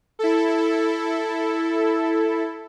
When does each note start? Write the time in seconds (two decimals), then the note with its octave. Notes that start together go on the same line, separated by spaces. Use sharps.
0.19 E4 A4